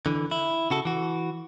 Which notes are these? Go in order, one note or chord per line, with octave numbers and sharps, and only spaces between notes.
D3 E3
E4
C#3 F#4 A4
E3 F#4